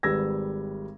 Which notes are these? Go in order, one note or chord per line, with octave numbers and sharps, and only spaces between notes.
G#1 G3 B4 E6 G#6 A#6